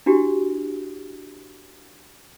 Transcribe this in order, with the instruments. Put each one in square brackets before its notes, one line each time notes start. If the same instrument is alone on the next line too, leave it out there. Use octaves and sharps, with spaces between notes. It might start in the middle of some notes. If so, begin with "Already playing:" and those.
[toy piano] D4 E4 F#4 G4